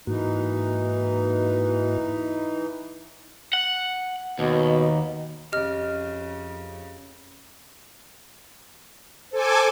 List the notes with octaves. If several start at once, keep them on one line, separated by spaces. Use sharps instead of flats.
G#2 E3 A#3 D#4 F#4
F#5
D#2 B2
F2 C#3 G4 D#5 F6
A4 C5 G#5 D6